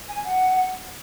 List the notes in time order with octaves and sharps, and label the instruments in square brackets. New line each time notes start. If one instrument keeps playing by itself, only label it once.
[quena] G#5
F#5